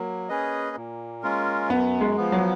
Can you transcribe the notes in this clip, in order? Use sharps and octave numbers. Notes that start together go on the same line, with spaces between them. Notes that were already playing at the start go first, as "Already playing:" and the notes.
Already playing: F#3 A#3
C#4 G#4 B4 D#5
A#2
G#3 C#4 F4 A#4
F#2 B3
G#3
F3 B3
F#3